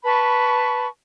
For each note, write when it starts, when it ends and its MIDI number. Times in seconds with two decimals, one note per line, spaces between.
0.04 0.87 71
0.04 0.87 81
0.04 0.87 83
0.04 0.87 85